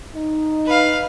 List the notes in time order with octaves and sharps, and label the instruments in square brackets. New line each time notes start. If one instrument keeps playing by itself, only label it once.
[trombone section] D#4
[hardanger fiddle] B4 F5